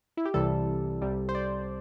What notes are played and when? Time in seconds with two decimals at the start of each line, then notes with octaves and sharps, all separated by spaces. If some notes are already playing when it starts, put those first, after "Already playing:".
0.17 E4
0.25 G4
0.34 C2 C3 E3 G3 A4
1.02 C2 C3 G3
1.29 C5
1.35 D5